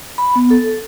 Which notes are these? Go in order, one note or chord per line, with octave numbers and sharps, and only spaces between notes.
B5
B3
A4